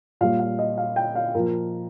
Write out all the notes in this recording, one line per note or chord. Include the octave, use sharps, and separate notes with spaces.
A#2 G3 F5
F5
D#5
F5
G5
F5
A#2 F3 A#4